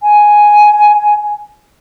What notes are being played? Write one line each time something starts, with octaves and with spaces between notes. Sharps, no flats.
G#5